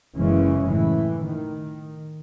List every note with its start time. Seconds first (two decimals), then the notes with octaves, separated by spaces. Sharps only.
0.18 F#1 C#3 E3 G#3 C#4
0.68 A2 E3
1.28 D#3